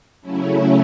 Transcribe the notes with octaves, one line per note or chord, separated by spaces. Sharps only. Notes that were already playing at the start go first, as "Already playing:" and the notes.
C#3 F#3 A3 C#4 E4